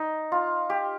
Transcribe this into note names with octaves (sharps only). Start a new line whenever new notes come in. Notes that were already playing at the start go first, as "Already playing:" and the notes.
Already playing: D#4
F4
G4